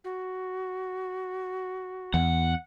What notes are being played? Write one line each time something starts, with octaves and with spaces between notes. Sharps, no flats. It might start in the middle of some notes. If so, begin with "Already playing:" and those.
F#4
E2 F#5